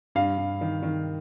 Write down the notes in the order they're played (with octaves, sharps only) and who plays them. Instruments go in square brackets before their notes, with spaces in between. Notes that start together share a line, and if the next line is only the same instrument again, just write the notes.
[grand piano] G2 F5
G2
D#3
D#3